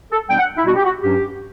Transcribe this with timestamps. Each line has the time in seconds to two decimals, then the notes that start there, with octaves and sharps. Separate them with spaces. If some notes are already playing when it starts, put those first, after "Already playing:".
0.11 A4
0.29 B2 G3 B3 D4 G5
0.38 F#5
0.57 E4
0.65 B2 G3 B3 D4 F#4
0.75 G4
0.84 F#4
1.02 G2 F#3 C#4 G4